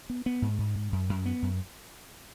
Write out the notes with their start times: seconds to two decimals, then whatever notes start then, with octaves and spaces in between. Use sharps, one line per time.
0.10 B3
0.26 B3
0.42 G#2
0.59 G#2
0.75 G#2
0.92 F#2
1.09 F#2
1.26 B3
1.42 F#2